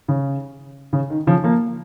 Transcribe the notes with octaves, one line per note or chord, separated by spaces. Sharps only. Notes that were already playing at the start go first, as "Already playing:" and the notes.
C#3
C#3
D#3
C#3 F3
F3 A#3